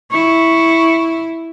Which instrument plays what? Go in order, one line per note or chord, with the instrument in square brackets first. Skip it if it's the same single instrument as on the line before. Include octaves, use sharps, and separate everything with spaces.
[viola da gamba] E4 [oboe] C#6